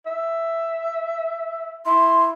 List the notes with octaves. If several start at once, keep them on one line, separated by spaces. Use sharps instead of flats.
E5
E4 C6